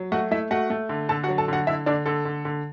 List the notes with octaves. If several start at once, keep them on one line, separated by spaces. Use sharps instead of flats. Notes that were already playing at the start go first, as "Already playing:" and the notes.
Already playing: F#3
A3 F#4 F#5
A3 E4 E5
A3 F#4 F#5
A3
D3
D3 A4 A5
F#4 F#5
F#3
A4 A5
D3 F#4 F#5
D3 E4 E5
D3 D4 D5
D3 A4
D3
D3